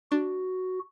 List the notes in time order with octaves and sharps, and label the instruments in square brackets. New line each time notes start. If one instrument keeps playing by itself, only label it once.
[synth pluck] D4 [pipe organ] F#4